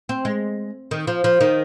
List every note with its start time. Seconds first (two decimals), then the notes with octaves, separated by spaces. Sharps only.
0.09 C4
0.25 G#3
0.91 D#3
1.07 F3
1.24 F3
1.41 D#3